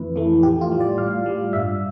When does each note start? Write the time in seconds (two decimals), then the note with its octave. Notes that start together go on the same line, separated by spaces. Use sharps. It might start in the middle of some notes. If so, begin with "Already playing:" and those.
Already playing: F2 E3 A3 B4
0.16 E3 A3
0.43 A2 G4
0.61 F4
0.72 G3
0.80 D5
0.98 A2 F5
1.26 G3
1.53 G2 E5